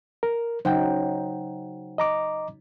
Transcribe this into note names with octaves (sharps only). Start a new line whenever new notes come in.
A#4
C#3 F#3 D#4 C5 F#5 G5
D#5 A#5 D6